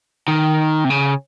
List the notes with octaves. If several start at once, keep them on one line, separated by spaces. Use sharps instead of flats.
D#3
C3
C#3